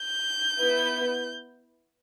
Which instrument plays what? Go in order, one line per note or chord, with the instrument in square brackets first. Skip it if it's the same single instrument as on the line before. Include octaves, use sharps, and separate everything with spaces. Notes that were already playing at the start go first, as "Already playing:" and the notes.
Already playing: [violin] G6
[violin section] B3 E4 B4